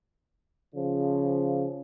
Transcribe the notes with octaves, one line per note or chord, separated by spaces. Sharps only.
C#3 F3